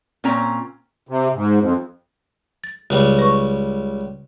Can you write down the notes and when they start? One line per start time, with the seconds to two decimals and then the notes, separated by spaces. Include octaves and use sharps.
0.24 A#2 C4 C#4 A#5
1.09 C3
1.35 G#2
1.60 F2
2.64 A6
2.90 C#2 C#3 G3
3.19 B4 C#6